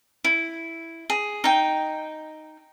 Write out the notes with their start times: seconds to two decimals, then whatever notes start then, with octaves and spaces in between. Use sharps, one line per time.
0.24 E4
1.10 G#4
1.44 D#4 G5